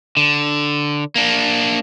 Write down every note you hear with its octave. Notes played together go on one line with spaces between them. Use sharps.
D3
A#3 D4